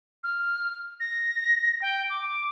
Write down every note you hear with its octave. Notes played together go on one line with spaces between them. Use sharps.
F6
A#6
G5
D6